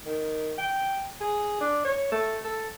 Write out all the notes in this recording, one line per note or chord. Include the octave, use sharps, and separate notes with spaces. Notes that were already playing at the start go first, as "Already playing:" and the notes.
D#3
G5
G#4
D4
C#5
A3
A4